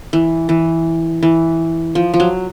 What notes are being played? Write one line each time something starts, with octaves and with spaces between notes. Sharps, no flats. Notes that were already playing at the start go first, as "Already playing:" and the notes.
E3
E3
E3
F3
F3
F#3